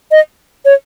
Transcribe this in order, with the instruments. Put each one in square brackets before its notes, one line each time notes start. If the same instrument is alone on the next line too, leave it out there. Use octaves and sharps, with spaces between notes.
[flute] D#5
C#5